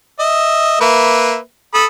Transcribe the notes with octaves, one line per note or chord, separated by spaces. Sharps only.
D#5 E5
A#3 B4 E5
A4 B5 D#6